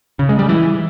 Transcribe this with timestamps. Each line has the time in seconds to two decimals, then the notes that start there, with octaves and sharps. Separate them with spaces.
0.19 C#3
0.29 G#3
0.39 G3
0.49 E3